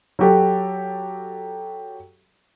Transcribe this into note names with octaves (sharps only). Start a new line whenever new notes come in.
F#3 F#4 G4 A4